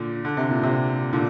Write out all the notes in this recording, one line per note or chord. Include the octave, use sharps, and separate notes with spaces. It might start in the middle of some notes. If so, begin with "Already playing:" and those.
Already playing: A#2 D3
D3
C3
A#2
C3
A#2 D3